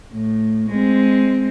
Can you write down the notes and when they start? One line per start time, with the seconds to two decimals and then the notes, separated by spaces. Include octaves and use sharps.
0.12 A2
0.70 G#3 C4